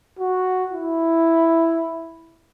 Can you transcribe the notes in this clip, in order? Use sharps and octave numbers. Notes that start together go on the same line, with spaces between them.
F#4
E4